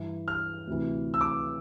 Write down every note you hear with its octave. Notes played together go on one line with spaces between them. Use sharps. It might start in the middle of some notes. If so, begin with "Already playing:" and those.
Already playing: G2 E3
F6
D2 C3 E3
E6
D6